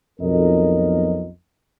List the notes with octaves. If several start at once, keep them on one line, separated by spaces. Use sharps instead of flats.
B1 F2 A#4 D#5